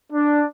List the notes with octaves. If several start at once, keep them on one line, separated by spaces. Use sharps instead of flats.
D4